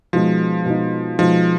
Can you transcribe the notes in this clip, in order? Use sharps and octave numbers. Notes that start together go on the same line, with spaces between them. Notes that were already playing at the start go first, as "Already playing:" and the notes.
B2 F3 G#3 D#4
B2 G#3 D#4
B2 F3 G#3 D#4